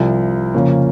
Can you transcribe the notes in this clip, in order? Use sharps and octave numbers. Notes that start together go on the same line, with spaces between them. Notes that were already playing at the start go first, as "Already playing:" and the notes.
Already playing: C2 C3 F3
F2 C#3 F3 A#3 C#4